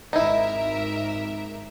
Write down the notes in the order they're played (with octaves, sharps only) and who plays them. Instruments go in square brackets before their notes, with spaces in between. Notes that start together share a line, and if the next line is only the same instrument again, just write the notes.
[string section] G#1 A#4 E5 [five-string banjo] D#4 E4